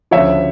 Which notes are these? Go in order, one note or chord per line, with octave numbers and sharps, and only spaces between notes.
D2 C#3 F3 C#5 E5